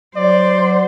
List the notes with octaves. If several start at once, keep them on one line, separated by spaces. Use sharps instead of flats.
F#3 C5 D5